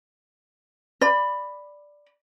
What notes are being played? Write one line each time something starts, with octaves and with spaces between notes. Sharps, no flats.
D5 B5